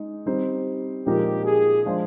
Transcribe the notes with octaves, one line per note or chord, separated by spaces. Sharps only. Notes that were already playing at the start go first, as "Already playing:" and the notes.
Already playing: G#3 D#4
G3 C4 D#4 G4 C5
A#2 F3 G#3 D#4 G4 A#4
G#4
F3 G#3 D4 F4 C5